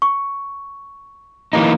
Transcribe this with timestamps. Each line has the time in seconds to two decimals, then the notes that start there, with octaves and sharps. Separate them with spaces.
0.02 C#6
1.53 E3 A#3 D#4